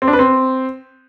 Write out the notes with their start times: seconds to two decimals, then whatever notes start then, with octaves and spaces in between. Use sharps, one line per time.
0.02 C4
0.08 D4
0.13 B4
0.19 C4